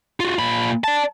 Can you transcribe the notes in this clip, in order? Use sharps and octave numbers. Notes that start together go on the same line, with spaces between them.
F4 F#4
A#2 B5
D5 A5